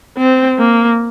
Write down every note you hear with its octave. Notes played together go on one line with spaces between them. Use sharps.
C4
A#3